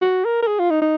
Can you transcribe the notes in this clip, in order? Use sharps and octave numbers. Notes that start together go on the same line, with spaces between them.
F#4
A#4
A#4
G#4
F4
D#4
D#4